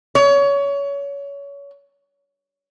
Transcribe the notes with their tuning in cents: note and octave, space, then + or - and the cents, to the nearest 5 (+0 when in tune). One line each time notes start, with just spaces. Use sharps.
C#5 +25